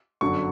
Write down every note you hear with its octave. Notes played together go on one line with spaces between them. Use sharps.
G1 F#2 D3 F#3 C#6